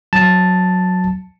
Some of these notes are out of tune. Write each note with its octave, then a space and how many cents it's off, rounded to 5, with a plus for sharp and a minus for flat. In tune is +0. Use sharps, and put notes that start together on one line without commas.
F#3 -10 A5 +0